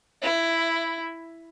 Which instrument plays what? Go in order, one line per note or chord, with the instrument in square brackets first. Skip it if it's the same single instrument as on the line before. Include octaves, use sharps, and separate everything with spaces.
[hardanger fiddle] E4